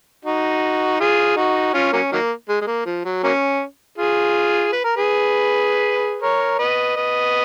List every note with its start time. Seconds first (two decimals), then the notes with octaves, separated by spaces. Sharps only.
0.25 D#4 F#4
1.00 F4 G#4
1.37 D#4 F#4
1.74 C#4 F4
1.93 F#3 A#3 C#4
2.12 D#3 F#3 A#3
2.49 G#3
2.61 G#3
2.67 A#3
2.86 F3
3.05 F#3
3.23 F#3 A#3 C#4
3.98 F4 G#4
4.73 B4
4.84 A#4
4.96 G#4 B4
6.22 A#4 C#5
6.59 B4 D#5
6.96 B4 D#5